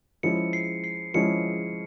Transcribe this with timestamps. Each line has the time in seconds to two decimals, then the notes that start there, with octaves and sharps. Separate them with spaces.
0.23 F3 G#3 C#4 E4 C#7
0.53 C7
0.84 C7
1.14 F3 G#3 C#4 E4 C#7